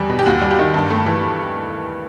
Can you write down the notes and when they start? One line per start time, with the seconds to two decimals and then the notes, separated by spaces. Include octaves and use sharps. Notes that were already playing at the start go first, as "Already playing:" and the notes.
Already playing: E2 E3 G3
0.09 B2
0.19 G4
0.26 D#2 F#4
0.42 G3
0.51 G4
0.59 D#3
0.74 G2
0.90 A3
1.06 E3